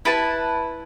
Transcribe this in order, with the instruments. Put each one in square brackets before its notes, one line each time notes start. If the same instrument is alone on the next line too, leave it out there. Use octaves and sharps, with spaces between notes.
[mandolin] E4 B4 A5